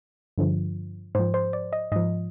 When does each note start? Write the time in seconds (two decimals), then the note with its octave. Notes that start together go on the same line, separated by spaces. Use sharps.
0.38 G2 D3 F3
1.15 G#2 F3 C5
1.34 C5
1.53 D5
1.73 D#5
1.92 G#2 F3 D#5